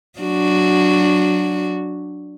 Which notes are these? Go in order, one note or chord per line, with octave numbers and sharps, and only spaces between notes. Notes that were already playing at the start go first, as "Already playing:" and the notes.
F#3 D4 F#4